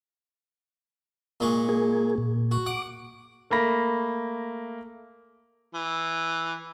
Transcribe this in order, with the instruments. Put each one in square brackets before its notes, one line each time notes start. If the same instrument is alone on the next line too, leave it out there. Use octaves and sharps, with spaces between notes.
[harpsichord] A#2 G#3 C#6
[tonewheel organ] A#3 G#4
A#2
[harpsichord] F#4
[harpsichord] F#5 [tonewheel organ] D6
[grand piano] A3 A#3 B5 A#6
[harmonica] E3